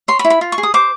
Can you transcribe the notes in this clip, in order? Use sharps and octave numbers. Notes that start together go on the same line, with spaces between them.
C#5 C6
B5
E4
B5
F4
C#6
G#4
D#6
C5 D6